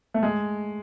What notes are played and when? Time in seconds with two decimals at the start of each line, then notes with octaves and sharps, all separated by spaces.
0.14 A3
0.23 G#3